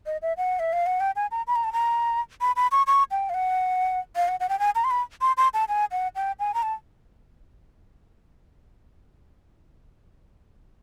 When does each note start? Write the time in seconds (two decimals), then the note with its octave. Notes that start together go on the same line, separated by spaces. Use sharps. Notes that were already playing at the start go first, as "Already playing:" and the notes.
0.06 D#5
0.22 E5
0.37 F#5
0.59 E5
0.73 F5
0.86 F#5
1.00 G5
1.16 G#5
1.31 A#5
1.47 B5
1.56 A#5
1.64 A5
1.73 A#5
2.41 B5
2.56 B5
2.72 C#6
2.87 C#6
3.11 G5
3.29 F5
3.34 F#5
4.16 F5
4.28 F#5
4.40 F#5
4.49 G5
4.59 G#5
4.75 A#5
4.84 C6
4.91 B5
5.21 C6
5.37 C6
5.54 A5
5.69 G#5
5.92 F#5
6.16 G5
6.39 G#5
6.54 A#5
6.63 A5